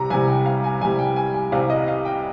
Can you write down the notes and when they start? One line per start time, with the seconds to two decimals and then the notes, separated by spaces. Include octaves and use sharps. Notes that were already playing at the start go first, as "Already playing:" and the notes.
Already playing: C2 C3 G3 A#5
0.10 C2 C3 G3 G#5
0.28 G5
0.46 F5
0.64 G#5
0.81 C2 C3 G3 G#5
0.99 G5
1.16 G#5
1.34 G#5
1.52 C2 C3 G3 F5
1.70 D#5
1.88 F5
2.05 G5